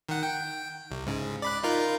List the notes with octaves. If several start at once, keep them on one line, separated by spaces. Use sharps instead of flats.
D#3 F#5
G5
C2
G#2 C#3
D5 B5 F#6
D#4 F4 A#4